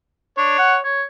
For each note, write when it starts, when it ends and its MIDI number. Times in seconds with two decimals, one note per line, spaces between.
0.38 0.56 62
0.38 0.80 73
0.58 0.76 78
0.84 1.03 73